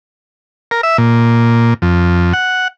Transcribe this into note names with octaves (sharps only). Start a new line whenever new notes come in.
A#4
E5
A#2
F2
F#5